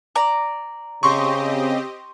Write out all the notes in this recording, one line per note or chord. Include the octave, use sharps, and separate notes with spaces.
D5 A#5
C#3 C4 G4 D#5 C6 C#6